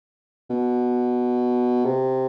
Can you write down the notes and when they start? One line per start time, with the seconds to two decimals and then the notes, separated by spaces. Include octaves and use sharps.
0.50 B2
1.85 C3